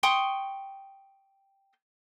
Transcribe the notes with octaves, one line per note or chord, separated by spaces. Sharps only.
G5 C6 C#6 D#6